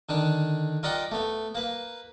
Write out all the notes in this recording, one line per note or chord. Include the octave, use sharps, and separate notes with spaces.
D3 D#3 D4
F4 A#4 D5 D#5 F#5 G5
A3 B3
A#3 B4